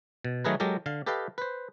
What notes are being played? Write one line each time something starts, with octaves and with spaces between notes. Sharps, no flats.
B2
D#3 F#3 A3 G#4 A#4 B4
F#3 G#3 G4 A4 A#4
D3 F5
G4 A4 B4 D#5 F5 G5
B4 C5